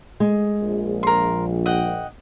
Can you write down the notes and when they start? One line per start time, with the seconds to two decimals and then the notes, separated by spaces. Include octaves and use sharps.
0.20 G#3
0.61 A#1
1.03 A#4 C6
1.66 D#5 F#5 G5